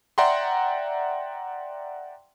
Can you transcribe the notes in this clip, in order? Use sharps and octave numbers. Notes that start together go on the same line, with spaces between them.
D5 E5 F#5 G5 A#5 C6